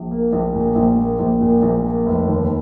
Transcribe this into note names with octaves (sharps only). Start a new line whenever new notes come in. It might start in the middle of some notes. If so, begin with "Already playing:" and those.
Already playing: A#1
A#3
A#1
A#2
A#1
A#3
A#1
A#2
A#1
A#3
F1
D#2